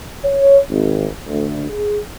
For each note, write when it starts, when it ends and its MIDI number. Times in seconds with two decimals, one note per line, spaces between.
0.24 0.59 73
0.70 1.06 32
1.26 1.65 38
1.70 1.98 68